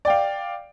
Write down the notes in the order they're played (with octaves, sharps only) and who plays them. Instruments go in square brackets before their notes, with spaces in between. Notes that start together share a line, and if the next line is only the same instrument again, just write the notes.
[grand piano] D5
G5
F5